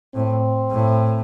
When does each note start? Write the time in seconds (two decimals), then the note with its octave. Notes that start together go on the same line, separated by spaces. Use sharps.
0.15 A2 C4
0.71 A2